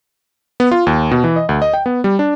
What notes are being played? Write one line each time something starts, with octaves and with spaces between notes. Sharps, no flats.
B3
F4
D#2
B2
E3
D#5
D2
D#5
G5
B3
G3
D4